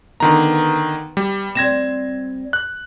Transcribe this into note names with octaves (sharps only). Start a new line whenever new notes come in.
D3 D#3 B3 A#5
G3
G3 C4 G#6 A#6 E7
F#6